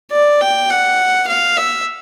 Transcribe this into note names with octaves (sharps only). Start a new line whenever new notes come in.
D5
G5
F#5
F5
E5